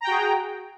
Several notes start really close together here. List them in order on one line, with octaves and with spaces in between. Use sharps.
A#5 G5 F#4 G#4